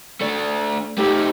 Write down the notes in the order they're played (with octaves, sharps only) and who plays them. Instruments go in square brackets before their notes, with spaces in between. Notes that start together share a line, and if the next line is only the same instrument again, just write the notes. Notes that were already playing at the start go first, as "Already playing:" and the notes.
[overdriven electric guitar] A3 D4
[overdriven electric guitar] A3 D#4 [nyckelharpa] G4